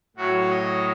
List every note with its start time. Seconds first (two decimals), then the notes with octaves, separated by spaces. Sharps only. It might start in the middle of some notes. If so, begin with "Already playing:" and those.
0.16 A2 F#3 F#4
0.50 D#5